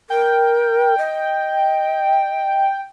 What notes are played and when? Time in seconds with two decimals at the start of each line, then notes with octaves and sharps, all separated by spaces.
0.10 A#4 G5
0.98 D#5